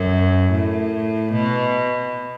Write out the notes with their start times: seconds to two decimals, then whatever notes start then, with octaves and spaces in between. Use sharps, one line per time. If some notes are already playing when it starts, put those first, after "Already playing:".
Already playing: F#2
0.52 A2
1.34 B2